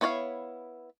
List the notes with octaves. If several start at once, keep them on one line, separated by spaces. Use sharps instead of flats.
B3 E4 C#5 D5 F5